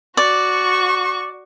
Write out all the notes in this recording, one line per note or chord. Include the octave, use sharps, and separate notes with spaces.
F#4 D5 C#6